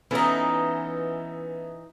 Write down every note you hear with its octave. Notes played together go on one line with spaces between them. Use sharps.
E3 B3 C#4 D#4 A4